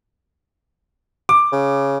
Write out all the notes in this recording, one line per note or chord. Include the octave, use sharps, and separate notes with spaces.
D6
C#3